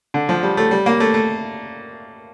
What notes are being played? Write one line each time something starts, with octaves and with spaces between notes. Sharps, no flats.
D3
F3
G3
A3
G3
A#3
A3
A3